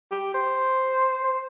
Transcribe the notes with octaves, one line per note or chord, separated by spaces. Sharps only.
G4
C5
C5